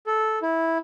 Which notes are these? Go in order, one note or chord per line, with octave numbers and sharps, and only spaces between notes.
A4
E4